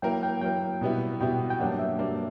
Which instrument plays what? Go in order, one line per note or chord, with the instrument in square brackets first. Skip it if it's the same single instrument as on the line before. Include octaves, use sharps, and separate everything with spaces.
[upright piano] F#3 A#3 E4 A#4 [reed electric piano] G5
[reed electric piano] G5
[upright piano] F#3 A#3 E4 A#4 [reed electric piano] G5
[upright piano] B2 G3 B3 E4
[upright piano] B2 G3 B3 E4 [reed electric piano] G5
[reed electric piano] G5
[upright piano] G2 F#3 A#3 D4 [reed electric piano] F#5
[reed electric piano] E5
[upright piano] G2 F#3 A#3 D4